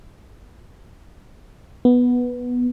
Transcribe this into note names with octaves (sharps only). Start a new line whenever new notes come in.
B3